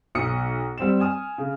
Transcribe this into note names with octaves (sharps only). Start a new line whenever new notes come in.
B1 D#6 C#7
G3 C4 E7
G#5 D#6 F6
C#3